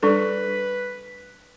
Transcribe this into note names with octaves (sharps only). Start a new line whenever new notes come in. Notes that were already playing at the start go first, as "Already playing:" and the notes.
G3 D4 A4 B4